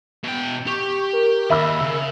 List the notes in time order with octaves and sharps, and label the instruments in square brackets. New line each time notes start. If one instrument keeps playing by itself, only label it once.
[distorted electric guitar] B2 G5
[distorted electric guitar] G4 [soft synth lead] C#6
[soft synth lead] A#4
[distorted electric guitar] D#2 [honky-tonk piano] E5 B5 E6
[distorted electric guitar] C#3